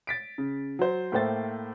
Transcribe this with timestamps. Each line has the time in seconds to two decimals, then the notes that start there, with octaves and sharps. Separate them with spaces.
0.07 A6 B6 D7
0.38 C#3
0.79 F#3 C5
1.12 A2 A3 A#3 C5 G5 A6